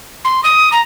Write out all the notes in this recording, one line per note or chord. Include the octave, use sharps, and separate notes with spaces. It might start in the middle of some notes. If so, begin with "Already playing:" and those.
C6
D#6
A#5